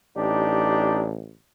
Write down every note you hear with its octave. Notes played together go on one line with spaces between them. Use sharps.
A1 D4 D#4 G4